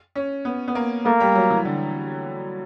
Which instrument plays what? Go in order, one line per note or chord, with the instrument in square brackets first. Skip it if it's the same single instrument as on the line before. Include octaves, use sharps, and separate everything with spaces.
[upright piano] C#4
B3
B3
A#3
[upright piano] A3 [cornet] A#3
[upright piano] G3
F#3
E3
D3